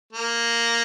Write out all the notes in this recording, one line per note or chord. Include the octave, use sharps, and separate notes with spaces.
A#3